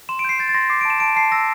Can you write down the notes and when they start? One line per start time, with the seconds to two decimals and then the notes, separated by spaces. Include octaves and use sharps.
0.09 C6 E7
0.19 D7
0.25 G6 C7
0.39 G6 A6
0.49 A6
0.55 C6 A#6
0.70 D6 C7
0.81 D7
0.85 A5 E7
1.00 A5 D7
1.16 A5 C7
1.32 E6 A#6